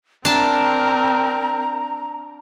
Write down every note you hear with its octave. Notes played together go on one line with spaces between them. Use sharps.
C4 D4 A#4 A5 A#5